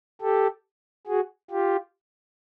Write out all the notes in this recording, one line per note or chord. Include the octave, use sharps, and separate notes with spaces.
G4 A4
F#4 G#4
F4 G4